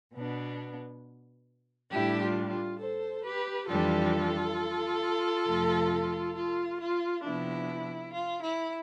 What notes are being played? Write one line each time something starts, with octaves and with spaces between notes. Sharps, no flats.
B2 B3 D4
A2 G3 D4 E4 G4
F4
F4
A4 C5
G4 B4
F2 E3 G3 D4 F4 A4
F2 C3 F3 A3
F4
F4
C3 F3 B3 D4 E4
F4
E4